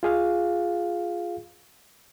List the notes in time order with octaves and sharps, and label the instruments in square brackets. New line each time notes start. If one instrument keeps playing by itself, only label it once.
[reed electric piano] F4 G#4 F5